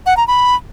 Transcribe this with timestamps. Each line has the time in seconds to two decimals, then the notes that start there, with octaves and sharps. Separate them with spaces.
0.06 F#5
0.17 A#5
0.28 B5